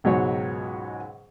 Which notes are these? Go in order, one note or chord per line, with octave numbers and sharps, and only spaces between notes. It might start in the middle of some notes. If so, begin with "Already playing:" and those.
C#2 G#2 B2 F#3 G#3 C#5